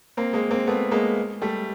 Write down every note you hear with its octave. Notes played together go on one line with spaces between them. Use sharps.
A#3 C4
G#3 A#3
A#3 C4
A3 B3
G#3 A#3
G3 A3